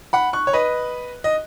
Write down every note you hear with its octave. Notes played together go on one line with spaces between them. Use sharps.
F#5 B5
C#6 F#6
C#5
B4 D#5
D#5